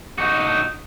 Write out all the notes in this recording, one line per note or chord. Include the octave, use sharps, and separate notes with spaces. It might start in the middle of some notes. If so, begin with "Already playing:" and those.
D#4 F#4